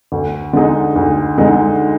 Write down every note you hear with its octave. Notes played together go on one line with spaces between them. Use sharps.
D2
D3 G#3 D#4
D2
D3 G#3 D#4